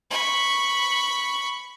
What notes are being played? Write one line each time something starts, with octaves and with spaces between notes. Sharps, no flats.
B5 C#6